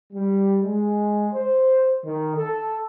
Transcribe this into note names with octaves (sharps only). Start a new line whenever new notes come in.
G3
G#3
C5
D#3
A4